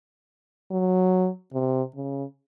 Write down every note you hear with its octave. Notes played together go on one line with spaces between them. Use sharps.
F#3
C3
C#3